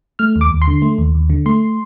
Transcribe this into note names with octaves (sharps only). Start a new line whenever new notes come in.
A3 F6
D#2
D6
D#2
C6
D3
A3
D#2
D#2
D3
A3 C6